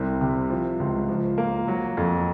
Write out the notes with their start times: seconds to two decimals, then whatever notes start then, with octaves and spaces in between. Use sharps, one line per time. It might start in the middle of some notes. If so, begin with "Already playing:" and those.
Already playing: C2 C3
0.21 C3
0.50 F3
0.80 C#2
1.09 F3
1.38 A#3
1.68 F#3
1.97 F2